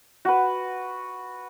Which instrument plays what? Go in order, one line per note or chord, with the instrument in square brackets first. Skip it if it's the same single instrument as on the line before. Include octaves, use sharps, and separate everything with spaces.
[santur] F#4 B4